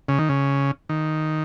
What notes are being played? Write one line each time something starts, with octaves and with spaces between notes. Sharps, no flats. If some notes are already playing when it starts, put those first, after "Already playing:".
C#3
D#3
C#3
D#3